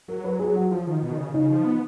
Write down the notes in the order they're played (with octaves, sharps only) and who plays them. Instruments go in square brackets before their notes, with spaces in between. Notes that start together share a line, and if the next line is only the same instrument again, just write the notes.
[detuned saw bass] F#3 [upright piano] A#4
[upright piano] B4
G#4
F#4
[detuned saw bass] F3 [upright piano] F4
[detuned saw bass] D#3
B2
D#3
C#3
[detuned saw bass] C#3 [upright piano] D#4
[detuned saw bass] F3
B3